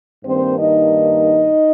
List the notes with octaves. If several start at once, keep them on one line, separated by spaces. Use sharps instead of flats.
G2 D#3 A#3 C4 C5
D#4 D#5